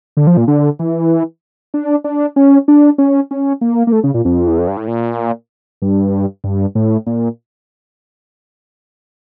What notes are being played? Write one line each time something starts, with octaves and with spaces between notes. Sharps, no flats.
D3
F3
A#2
D3
E3
D4
D4
C#4
D4
C#4
C#4
A#3
A#3
A3
C#3
A#2
F2
E2
F2
G2
A2
A#2
G2
G2
A2
A#2